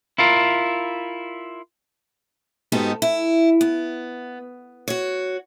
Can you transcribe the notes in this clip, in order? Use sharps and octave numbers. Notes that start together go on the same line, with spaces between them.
E4 F4 A#4
G#2 B3 D#4 F#4 G4 A4
E4
B3
F#4 C#5